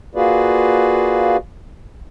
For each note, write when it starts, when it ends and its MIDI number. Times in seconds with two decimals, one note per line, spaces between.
0.15 1.37 58
0.15 1.37 65
0.15 1.37 66
0.15 1.37 68
0.15 1.37 71
0.15 1.37 74